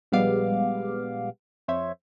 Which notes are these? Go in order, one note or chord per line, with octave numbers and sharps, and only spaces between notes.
A#1 G3 G#3 B3 F5 D6
F2 C5 C#5 E5 G#6